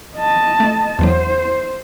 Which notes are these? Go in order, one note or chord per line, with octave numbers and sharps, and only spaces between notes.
D#5 A5
A3
E2 E3 F#3 C5